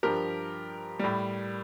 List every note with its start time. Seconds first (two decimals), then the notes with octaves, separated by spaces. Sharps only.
0.03 G2 F3 G4 A#4
0.99 A2 G3